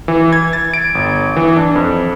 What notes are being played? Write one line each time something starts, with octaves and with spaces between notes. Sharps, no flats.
E3
G#6
A6
D7
G1
E3
D4
F2